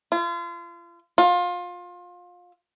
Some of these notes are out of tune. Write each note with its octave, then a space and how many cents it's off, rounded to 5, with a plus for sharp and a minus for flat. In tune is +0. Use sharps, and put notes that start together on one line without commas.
F4 -35
F4 +25